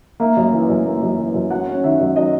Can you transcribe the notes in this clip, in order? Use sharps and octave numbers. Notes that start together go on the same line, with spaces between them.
A#3 E5
F#2
E3
F#2
A#3
F#2
E3
F#2
F#3 F#5
C#4
D#3 E5
F#2
F#3 D#5